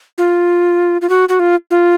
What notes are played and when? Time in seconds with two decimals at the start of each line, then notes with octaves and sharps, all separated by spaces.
0.18 F4
1.02 F4
1.10 F#4
1.29 F#4
1.40 F4
1.71 F4